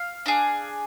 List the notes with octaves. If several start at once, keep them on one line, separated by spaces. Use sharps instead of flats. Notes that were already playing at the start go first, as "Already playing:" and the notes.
Already playing: F5
D4 G#4